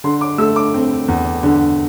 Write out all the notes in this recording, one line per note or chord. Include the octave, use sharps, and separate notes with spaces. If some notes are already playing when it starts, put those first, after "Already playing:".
D3 C6
D6
A3 E6
D6
C4
E2
D3